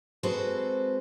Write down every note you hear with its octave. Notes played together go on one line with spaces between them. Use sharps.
G#3 C4 F#4 A4 B4 C5